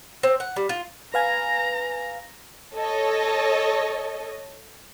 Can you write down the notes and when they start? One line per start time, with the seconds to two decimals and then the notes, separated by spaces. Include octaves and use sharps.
0.23 C4
0.40 F#5
0.56 G3
0.69 F4
1.14 B4 F5 G#5 A#5
2.75 A4 C#5 D#5